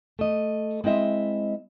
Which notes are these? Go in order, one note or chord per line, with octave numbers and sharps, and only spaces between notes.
A3 D#5
G#3 C4 E4 D#5 E5